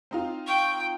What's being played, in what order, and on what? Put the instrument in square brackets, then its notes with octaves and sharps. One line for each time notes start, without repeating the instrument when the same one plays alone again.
[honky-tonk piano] C4 D#4 F4
[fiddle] G5 [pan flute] C#6